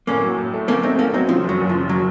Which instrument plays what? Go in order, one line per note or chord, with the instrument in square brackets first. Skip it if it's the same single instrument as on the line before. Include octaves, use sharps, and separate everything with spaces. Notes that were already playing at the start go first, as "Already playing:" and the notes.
[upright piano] A2 [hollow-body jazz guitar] A#3 C#4
[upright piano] F#3
A2
A3
[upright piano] A3 [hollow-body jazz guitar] A#3 C#4
[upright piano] A3 [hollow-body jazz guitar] C4 D#4
[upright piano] A3 [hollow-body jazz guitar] A#3 C#4
[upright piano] F#3 [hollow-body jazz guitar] C4 D#4
[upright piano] C#3 [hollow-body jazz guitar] F3
[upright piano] F#1 [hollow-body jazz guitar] F#3
[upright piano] F#1
[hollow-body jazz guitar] F3
[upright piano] C#3
[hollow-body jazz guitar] F#3